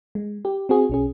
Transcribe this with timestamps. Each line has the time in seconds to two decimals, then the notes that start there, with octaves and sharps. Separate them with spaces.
0.15 G#3
0.45 G4
0.69 C4 F#4 G#4
0.90 B1 C#4 G#4